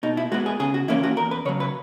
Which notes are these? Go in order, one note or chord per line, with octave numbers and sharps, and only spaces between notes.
B2 D#4
E4
G#3 B3 F#4
G#4
C#3 G#4
F#4
E3 A#3 C#4 E4
F#4
E2 A#4
B4
C#3 F#3 C#5
B4